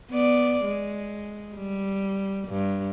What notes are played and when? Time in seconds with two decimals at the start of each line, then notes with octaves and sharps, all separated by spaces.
0.11 B3 D5
0.64 G#3
1.55 G3
2.48 G2